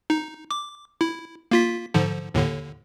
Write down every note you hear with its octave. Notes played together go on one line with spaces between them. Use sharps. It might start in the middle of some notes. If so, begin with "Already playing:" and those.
D#4
D6
E4
A#3 F4 B6
G#2 D3 F3
D#2 A2 D3